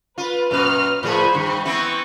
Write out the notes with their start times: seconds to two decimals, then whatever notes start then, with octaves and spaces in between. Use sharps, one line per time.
0.18 F4 B4
0.51 F#2 A#2 B4 F6
1.03 A2 F3 G#4 C5 B5 C#6
1.34 G2 D#3
1.65 E3 B3 C4 C#6